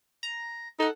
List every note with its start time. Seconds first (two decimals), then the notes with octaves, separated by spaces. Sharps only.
0.23 A#5
0.80 D#4 A4 F#5